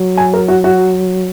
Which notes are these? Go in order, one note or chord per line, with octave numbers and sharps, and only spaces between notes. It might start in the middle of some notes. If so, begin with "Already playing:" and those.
Already playing: F#3
G#5
A#4
F#4
F#4